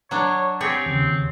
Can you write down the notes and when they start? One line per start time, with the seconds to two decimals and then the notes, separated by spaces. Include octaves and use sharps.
0.11 F#3 D4 C#5
0.61 C4 G4 G#4 C#5
0.86 D#2 C#3